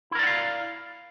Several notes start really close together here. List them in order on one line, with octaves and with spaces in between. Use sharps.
E4 A#4 D5 F#5 F5